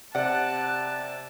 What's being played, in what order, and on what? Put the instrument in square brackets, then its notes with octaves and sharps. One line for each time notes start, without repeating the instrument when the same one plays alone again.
[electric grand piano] C3 D5 [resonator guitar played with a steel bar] F#5 [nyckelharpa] A5 [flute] F#6